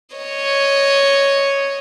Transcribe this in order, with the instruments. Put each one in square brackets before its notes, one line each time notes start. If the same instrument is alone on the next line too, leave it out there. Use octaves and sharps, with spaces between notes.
[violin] C#5 D#5